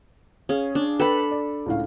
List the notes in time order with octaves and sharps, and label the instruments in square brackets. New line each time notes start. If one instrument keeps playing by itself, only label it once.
[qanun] C#4 [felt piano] G#4 F5
[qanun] D4
[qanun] A4 B5 [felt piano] B4 G5
[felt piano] D5
C#2 A2 F5